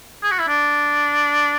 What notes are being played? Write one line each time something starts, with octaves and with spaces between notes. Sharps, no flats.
G#4
F#4
E4
D4